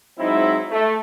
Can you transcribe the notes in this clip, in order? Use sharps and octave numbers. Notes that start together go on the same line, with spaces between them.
G#2 F#3 C4 D#4 E4
A3